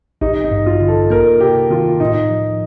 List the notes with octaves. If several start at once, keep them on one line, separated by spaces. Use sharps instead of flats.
A1 D#4
D#4
G2
F4
D3
A4
A#3 A#4
C3 G4
D#3 F4
A2 D#4
F3